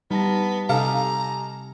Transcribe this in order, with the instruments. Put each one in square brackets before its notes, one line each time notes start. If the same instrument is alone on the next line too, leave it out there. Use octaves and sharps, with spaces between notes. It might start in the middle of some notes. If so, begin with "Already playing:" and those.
[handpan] G3 [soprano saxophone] B3 [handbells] D#4 A5 A#6
[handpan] C3 [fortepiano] D#4 A4 F5 [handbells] G4 G#5 [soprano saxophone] A#5